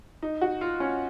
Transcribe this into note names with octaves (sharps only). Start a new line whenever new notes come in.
D#4
F#4
F4
C#4